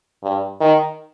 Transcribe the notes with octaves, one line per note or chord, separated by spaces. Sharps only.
G2
D#3